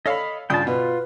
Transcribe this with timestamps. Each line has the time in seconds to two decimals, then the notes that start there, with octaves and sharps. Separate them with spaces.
0.06 A4 C#5 D#5 F5 B5
0.50 G2 C#3 F4 G5 A5 D#6
0.67 B2 F4 B4